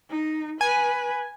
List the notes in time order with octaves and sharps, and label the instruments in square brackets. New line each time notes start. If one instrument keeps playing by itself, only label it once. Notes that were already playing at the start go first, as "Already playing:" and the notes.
[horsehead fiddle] D#4
[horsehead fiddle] B4 [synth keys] G#5